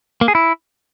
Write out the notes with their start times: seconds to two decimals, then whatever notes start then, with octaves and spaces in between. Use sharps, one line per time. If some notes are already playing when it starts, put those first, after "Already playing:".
0.21 A#3
0.28 G#4
0.35 E4